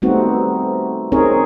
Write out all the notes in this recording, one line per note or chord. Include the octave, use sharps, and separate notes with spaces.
G3 A3 B3 C4 D#4 F#4
C4 C#4 D#4 G#4 A#4 C#5